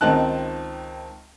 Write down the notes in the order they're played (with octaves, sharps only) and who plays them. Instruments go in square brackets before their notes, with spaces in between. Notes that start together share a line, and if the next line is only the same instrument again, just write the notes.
[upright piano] C#2 D#3 C4 D#4 A5 F#6